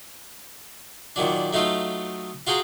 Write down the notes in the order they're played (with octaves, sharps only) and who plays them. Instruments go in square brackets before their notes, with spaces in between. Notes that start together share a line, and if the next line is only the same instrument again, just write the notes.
[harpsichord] A#2 D#3 F#3 D4
F#3 A3 D#4 F4 A4
F4 F#4 G#4 G5 A#5